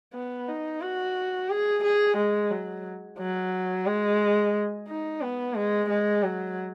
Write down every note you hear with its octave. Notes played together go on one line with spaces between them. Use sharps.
B3
D#4
F#4
G#4
G#4
G#3
F#3
F#3
G#3
D#4
B3
G#3
G#3
F#3